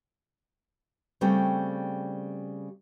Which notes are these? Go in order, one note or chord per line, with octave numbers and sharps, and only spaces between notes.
C#3 G3 A3 C4